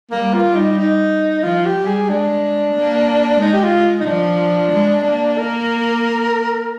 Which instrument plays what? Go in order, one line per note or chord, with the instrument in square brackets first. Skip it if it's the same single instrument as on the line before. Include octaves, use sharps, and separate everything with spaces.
[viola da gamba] G3 [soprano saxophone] A#3
[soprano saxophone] F4
[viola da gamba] G3
[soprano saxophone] D#4
D#4
[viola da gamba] F3 [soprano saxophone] F4
[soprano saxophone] G4
[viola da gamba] G3
[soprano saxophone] G#4
[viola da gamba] G#3 [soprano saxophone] D4
[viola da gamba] A#3
[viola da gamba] G#3 [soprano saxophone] D#4
[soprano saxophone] G4
F4
D#4
[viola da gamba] F3 [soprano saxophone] D4
[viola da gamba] G#3
A#3
[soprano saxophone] A#4